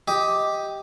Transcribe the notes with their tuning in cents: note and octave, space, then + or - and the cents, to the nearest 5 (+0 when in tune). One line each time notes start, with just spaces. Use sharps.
G4 +0 D#5 +15